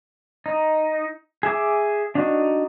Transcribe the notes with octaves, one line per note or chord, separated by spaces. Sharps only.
D#4
G#4 E5 D6
D4 D#4 F#4